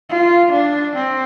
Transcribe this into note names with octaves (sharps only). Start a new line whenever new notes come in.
F4
D4
C4